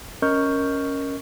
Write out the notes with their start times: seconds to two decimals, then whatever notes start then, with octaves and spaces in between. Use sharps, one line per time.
0.22 C#4 A#4 D#5 C#6 F6 G6